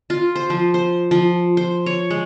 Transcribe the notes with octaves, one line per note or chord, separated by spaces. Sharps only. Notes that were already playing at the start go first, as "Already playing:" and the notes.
F4
C5
F3
C5
F3
C5
C#5
G#3